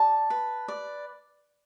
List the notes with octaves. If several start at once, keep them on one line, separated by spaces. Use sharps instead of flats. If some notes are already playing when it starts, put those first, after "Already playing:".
Already playing: D5 A5
B4
D5